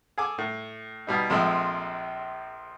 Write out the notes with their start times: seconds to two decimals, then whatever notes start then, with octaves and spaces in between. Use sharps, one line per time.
0.18 G#4 A4 G#5 D6
0.38 A2
1.07 B2 G3 D#4
1.30 A#1 C3 F3 G#3 A3